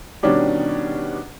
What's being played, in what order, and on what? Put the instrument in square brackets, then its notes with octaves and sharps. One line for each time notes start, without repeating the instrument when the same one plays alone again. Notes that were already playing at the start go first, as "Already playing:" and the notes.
[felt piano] B2 D#3 G3 C#4 D4 G4